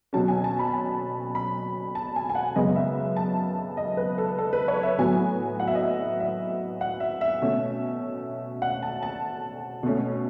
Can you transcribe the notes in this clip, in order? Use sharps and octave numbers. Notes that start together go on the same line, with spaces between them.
B2 F#3 C#4 A5
G#5
A5
B5
A5
B5
A5
G#5
G#5
F#5
F#2 C#3 G#3 B3 D#5
E5
A5
D#5
B4
A4
A4
B4
C#5
E5
A2 F#3 B3 G#5
F#5
E5
D#5
E5
E5
F#5
E5
E5
B2 A3 C#4
F#5
A5
A5
B2 A3 C#4